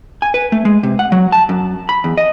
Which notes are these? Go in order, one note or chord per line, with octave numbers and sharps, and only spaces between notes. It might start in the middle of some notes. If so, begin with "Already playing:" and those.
G#5
B4
A3
G#3
C3
F#5
F#3
A5
F#2
B5
E2
D#5